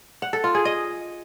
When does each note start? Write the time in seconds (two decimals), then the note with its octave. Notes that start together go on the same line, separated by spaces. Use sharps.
0.22 F#5
0.33 A4
0.44 F4
0.55 G#4
0.65 D#5